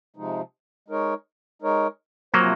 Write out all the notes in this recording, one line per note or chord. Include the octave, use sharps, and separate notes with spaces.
C3 F3 G#3 D#4
G#3 D#4 A#4 C#5
G#3 D#4 A#4 C#5
C3 F3 F#3 A#3 C4 F4 C5